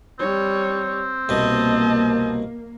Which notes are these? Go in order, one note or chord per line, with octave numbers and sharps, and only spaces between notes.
G3 C4 C#5
C2 B2 A#3 D#5 A5